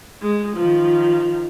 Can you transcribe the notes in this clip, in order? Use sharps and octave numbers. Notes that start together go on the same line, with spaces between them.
G#3
D#3 F3